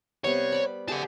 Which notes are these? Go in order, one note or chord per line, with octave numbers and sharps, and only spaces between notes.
C3 G3 B3 C#5
D5 B5
A3 G4 G#4 F#5 A5